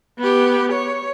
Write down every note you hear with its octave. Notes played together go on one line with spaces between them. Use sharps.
B3 G4
C#5